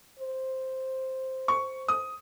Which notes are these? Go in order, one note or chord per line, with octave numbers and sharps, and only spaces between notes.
C5
C#6
D#6